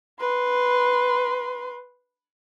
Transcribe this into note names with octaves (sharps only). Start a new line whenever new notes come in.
B4 C6